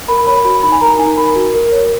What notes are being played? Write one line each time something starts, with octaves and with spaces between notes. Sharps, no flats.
A#4 B5
C#5 B5
F#4 B5
D#4 B5
G#5
A#4 A#5
D#4 G#5
A#4 B5
F#4
A#4
C#5